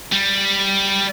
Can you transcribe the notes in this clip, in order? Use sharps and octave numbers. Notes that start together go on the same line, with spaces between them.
G3